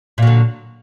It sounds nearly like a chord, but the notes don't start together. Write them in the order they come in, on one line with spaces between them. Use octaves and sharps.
A#2 F#3 D3